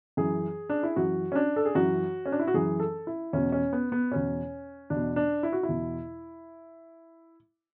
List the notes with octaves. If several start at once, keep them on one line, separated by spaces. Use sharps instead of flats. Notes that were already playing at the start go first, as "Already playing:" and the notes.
F#2 E3 G#4
D4
E4
F#2 E3 F#4
C#4
D4
A4
G#4
F#2 E3 F#4
C#4
D4
E4
F#4
F#2 E3 G#4
A4
E4
E2 B2 C#4
C#4
B3
B3
E2 B2 C#4
E2 B2 D4
D4
E4
F#4
E4
E2 B2